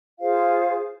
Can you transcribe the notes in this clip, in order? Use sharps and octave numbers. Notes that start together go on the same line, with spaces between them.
F4 G#4 C5 F5